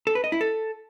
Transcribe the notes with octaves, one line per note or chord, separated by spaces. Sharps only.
A4
B4
D#5
E4
A4